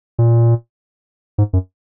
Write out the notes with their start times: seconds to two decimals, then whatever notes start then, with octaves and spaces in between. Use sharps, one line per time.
0.19 A#2
1.38 G#2
1.53 F#2